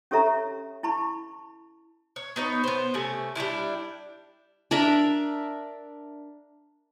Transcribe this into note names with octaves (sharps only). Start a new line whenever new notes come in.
C#4 G4 A4 C#5 E5 A#5
E4 A5 B5 C#6
C#5
B3 D#4 C#5
B3 C5
C3 A3 C#4
G3 G#3 D4 E4
D4 A#4 D5 E5